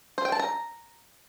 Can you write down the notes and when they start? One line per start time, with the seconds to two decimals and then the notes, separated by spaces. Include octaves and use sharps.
0.18 C5
0.25 G5
0.32 A5
0.40 A#5